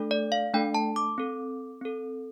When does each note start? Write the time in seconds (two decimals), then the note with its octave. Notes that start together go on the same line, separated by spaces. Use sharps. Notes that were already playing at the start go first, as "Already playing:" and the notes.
Already playing: A3 D4 A4
0.11 D5
0.32 F5
0.53 A3 D4 A4 G5
0.74 A5
0.96 D6
1.18 C4 A4
1.82 C4 A4